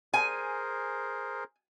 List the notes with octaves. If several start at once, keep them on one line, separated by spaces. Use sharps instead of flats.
G#4 A#4 C5 G#5